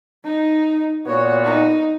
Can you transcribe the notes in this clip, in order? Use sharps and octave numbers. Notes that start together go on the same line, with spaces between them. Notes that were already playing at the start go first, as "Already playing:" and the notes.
D#4
A#2 B3 F#4 C#5
D#4